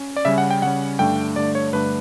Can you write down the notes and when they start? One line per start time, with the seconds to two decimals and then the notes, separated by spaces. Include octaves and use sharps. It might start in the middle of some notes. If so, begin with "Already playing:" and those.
Already playing: C#4
0.16 D5
0.25 C#3 G3 C#4 E5
0.38 F#5
0.50 G5
0.62 C#3 G3 C#4 F#5
0.99 G2 D3 A3 D4 G5
1.36 G2 D3 A3 D4 D5
1.55 C#5
1.73 G2 D3 A3 D4 B4